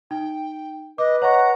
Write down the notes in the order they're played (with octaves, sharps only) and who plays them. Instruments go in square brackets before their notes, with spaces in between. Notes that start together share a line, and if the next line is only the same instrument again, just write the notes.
[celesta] D#4 [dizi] G5
[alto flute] B4 [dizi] D#5 [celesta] D6
[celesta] C#5 D#5 C#6 [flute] F#5 [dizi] A#5